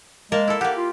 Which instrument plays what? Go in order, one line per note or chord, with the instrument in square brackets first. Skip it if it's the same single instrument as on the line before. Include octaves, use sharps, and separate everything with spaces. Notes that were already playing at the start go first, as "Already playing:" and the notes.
[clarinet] G#3 [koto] A#3 A#4 A5
[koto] E4 A4
[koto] A#3 G4 [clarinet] F#5
[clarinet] F4